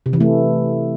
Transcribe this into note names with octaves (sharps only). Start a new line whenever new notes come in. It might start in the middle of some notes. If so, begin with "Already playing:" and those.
C3
E3
A3